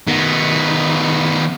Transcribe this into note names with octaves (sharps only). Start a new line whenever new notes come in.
D#3 B3